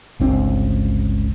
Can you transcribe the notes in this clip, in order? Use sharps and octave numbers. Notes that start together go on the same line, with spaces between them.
G1 C#2 C4 D4